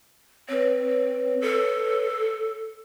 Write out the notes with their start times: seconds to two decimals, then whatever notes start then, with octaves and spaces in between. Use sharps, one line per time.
0.49 C4 B4 C#5
1.41 A4